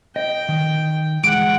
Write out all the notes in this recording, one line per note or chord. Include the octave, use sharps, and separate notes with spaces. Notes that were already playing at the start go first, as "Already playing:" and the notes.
D#5 G5
D#3
E3 G#3 F#5 D6